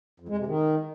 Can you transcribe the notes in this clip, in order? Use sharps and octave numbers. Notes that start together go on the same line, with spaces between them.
F2
G#3
C3
D#3